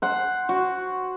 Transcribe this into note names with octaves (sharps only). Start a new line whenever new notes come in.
C5 F#5
F#4